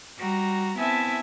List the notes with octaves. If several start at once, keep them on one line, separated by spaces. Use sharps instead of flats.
G3 F#4 A#5
B3 C4 E4 E5 G#5 A5